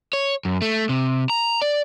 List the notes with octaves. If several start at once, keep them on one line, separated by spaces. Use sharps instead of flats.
C#5
F#2
A3
C3
A#5
D5